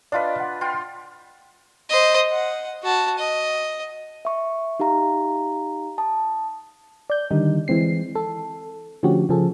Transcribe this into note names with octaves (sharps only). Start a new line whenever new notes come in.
D4 F4 B4 D5 D#5 F5
F#5
F4 G5 C6
C5 D#5
F#5
F#4 A5
D#5
E5 C#6
D#4 G4 F5 A#5
A5 D#6
D5 G6
D3 D#3 G3 D#4
E3 G#3 C4 C7
A4
D3 F3 A3 C#4 F#4 G4
C#3 F3 G#4 A4